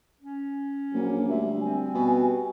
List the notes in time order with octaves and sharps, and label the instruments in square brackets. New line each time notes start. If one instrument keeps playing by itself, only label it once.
[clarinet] C#4
[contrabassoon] A#1 [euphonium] F#3 [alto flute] A#3
[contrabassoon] D2 [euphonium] G3 [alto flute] E5
[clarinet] C4 [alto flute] G#5
[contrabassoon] B2